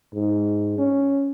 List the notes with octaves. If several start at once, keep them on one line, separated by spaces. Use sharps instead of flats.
G#2
C#4